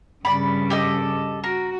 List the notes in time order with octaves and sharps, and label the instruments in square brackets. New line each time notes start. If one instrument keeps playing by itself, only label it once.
[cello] G2 C#3 [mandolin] D5 B5
[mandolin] G4 A4 D#5
[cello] F#4 [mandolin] A#4